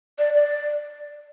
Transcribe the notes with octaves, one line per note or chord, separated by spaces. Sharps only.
D5
D5